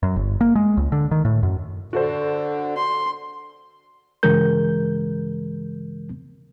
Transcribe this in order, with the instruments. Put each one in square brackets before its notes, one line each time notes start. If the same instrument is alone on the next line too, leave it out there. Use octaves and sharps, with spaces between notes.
[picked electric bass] F#2
G1
A#3
G#3
C#2
D3
D#3
A2
F#2
[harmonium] D3 [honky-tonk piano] F#4 A4 C5
[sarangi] C6
[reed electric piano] G2 C#3 E3 G#3 A#4 G6